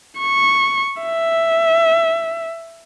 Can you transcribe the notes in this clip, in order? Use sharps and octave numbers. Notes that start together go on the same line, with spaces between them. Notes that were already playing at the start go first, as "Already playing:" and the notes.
C#6
E5